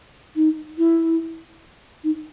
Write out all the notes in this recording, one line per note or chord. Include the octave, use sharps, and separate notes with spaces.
D#4
E4
D#4